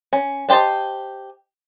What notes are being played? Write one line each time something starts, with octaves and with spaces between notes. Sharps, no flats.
C#4
D4 G4 C5 D#5 A5